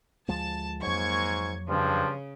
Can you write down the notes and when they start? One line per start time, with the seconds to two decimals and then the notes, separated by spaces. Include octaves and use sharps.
0.28 D2 F3 G#3 A5
0.82 F2 G#2 F#3 A#3 C#6 G#6
1.69 G2 C#3 F3